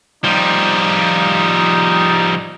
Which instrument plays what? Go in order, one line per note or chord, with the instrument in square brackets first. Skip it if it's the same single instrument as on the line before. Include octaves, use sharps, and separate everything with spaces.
[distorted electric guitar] F3 G3 [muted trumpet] D#4